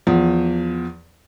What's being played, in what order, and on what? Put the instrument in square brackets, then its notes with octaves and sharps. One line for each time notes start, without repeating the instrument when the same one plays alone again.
[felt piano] E2 F3